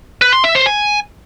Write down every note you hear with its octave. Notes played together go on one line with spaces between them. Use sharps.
B4
C6
E5
C5
G#5